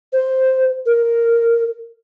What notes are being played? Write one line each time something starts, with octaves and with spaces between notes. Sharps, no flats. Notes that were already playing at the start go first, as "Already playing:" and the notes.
C5
A#4